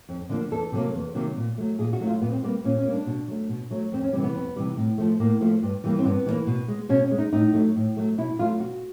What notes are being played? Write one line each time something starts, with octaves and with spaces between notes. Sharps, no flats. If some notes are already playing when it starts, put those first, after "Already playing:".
F2
D3 F3 A#3
E2 A4
C3 D#3 F#3 A#3
E2
C3 D#3 F#3 A#3
A#2
F#3 A3
A#2 G#4
F#4
F#3 A3
F4
A#2 B3
C4
G3 A#3 B3
A#2 C#4
C#4
G3 A#3
D4
B2
F#3 A3
B2
F#3 A3
F2 C4
C#4
C3 E3 G3 C4
B3
F2
C3 E3 G3
A2
F3 A3
A2 A#3
F3 A3
G2
E3 G3 A#3
C4
G2 B3
E3 G3 A#3
B2
G#3
B2 C#4
C#4
G#3
D#4
A2 D#4
F#3 A3
A2
F#3 A3
B2 E4
F#3 A3 F4
B2 F#4